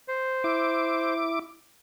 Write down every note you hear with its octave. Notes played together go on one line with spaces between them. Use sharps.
C5
E4 D6